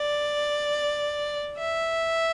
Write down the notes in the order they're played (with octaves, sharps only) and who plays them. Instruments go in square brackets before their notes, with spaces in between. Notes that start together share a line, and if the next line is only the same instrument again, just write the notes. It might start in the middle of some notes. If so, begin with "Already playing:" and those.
Already playing: [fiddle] D5
E5